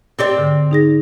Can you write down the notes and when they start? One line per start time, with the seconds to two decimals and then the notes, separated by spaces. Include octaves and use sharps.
0.19 C4 G4 D5
0.37 G#2 D3
0.71 D#4 G#4 A#6